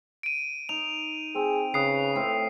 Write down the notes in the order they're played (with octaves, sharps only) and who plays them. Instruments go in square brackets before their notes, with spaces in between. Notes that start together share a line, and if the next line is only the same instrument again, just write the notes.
[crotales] D7 D#7
[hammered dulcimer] D#4 [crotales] F7
[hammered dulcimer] C4 [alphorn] G#4
[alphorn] C#3 [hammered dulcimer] B4 [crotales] D#6 C7
[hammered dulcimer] A2 C4 F5